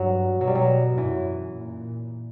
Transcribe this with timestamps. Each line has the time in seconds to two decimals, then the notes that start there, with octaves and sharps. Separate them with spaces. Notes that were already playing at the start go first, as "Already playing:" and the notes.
Already playing: G2 F#3
0.40 B2 F#3
0.48 G3
0.55 F#3
0.97 F#2 E3
1.54 A#2